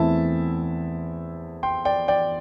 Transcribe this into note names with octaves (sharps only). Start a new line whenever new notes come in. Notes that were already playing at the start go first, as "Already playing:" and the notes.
Already playing: E2 E3 A3 C4 E4 E5 A5
G5 C6
D5 G5
D5 G5